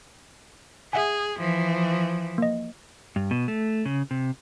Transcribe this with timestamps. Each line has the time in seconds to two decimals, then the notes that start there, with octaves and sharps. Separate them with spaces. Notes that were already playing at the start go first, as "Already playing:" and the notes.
0.93 G#4 E5 F#5 G#5
1.39 E3 F3
2.38 A#3 D#5
3.16 G2
3.31 B2
3.48 A3
3.86 C#3
4.11 C3